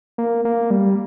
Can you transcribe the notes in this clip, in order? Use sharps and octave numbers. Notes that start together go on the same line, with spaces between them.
A#3
A#3
G3